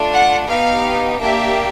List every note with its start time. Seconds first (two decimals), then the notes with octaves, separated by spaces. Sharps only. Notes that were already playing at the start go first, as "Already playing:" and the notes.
Already playing: A3 D4 F4
0.12 F#5
0.48 B3 D#4 G4 F5
1.20 A#3 D4 G4 E5